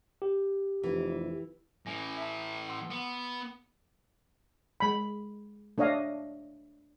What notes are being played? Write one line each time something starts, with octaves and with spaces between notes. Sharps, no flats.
G4
F1 E3
A2 E3 C#4 G#5 A#6
E5 A5
F#5 C6 E6
B3
G#3 B5
A3 D4 C#5 D#5 F5